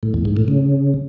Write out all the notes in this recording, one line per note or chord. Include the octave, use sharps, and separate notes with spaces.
A2
E2
G#2
A2
C#3